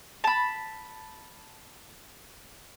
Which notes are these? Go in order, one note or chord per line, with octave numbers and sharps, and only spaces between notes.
A5 B5